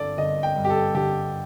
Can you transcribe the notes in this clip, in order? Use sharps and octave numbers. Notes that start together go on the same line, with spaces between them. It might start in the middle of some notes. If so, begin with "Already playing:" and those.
Already playing: G1 D3 A4 D5
G1 D#5
G5
G2
G4
A4
D3 G4